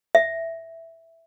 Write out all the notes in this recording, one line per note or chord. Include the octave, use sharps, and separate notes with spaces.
E5